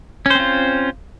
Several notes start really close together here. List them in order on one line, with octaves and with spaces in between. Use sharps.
C#4 C5 C4 F4